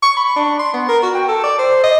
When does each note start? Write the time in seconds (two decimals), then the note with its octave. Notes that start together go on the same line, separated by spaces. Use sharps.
0.03 C#6
0.17 B5
0.36 D4
0.59 C6
0.73 B3
0.89 A#4
1.03 F#4
1.15 G5
1.28 A4
1.43 D5
1.59 C5
1.83 D#5